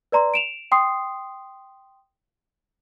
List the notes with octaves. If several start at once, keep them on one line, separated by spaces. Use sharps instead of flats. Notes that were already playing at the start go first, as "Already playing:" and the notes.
B4 D5 A#5 C6
D7 E7 F7
G5 C6 D#6 C7